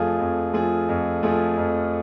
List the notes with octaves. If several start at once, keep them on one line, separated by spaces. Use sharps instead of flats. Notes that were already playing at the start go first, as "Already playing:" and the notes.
Already playing: F2 F3 A3 F4 G#4
F2
F3 A3 F4 G#4
F2
F3 A3 F4 G#4
F2